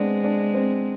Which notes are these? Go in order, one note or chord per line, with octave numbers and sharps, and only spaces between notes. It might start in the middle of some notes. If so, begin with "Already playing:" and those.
Already playing: G#3 B3 C4 D4 C5 D5
D4 D5
C4 C5